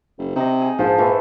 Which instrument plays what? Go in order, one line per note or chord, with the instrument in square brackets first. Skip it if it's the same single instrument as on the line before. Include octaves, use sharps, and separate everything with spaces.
[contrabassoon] F#1
[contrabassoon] C3 [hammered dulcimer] D#4 D#5
[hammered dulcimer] G#4
[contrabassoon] A#1 [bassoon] G#2 [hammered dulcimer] F3 C5
[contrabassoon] A#2 [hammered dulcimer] D#3 E3 A4